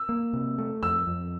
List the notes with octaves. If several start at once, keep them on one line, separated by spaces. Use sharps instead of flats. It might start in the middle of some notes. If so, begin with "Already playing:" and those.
Already playing: E6
A#3
C3
A3
F2 E6
F2